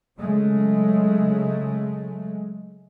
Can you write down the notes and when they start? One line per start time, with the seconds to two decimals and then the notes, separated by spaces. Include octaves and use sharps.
0.17 C#3 F#3 G#3 A3